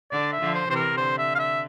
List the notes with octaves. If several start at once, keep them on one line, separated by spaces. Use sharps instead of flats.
D3 D5
E5
D3 F3
C5
C3 E3 C5
A#4
D3 C5
E5
F5
E5